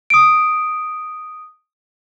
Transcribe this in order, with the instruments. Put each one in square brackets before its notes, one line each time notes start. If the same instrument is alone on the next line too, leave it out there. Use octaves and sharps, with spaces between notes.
[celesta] D#6 D7